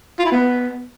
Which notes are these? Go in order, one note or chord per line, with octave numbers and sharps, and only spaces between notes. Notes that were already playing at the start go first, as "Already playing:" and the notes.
F4
E4
B3